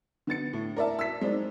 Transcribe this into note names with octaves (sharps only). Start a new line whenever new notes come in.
D3 B3 A6 C#7
A2
A#4 D5 E5 A5
E6 B6
G#3 C4 D#4 D5